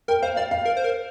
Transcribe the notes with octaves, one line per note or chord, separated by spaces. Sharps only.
A#4 G5
C5 F5
D5 F5
F5
A#4
C5
A#4